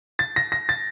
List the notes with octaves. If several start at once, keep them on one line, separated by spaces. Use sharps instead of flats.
A6
A#6
A#6
A6